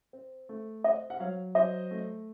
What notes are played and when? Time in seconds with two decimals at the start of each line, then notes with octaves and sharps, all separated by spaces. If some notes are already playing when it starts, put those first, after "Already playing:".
0.13 C4
0.49 A3
0.84 C4 D#5 F#5
1.10 F#5
1.20 F#3 C#5 F5
1.55 F#3 C5 D#5
1.91 A3